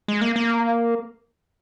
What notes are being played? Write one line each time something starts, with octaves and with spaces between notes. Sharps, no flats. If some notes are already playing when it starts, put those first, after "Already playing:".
G#3
A#3
A#3